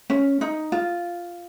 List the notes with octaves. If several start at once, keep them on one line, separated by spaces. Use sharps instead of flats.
C#4
D#4
F4